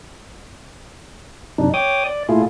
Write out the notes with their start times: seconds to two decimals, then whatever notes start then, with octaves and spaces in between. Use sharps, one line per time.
1.58 F#2 C3 D4 D#4
1.74 C#5 G5 D6 D#6
2.05 D5
2.29 A#2 A3 E4 F4 G#4